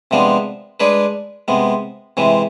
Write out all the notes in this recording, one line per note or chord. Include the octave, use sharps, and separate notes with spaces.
C3 F3 G#3 B3 D4
G#3 D4 G#4 B4 D5
C3 G#3 B3
C3 E3 G#3